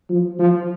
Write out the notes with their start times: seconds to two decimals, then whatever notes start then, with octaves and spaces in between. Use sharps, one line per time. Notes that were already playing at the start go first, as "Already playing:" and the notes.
0.10 F3
0.39 F3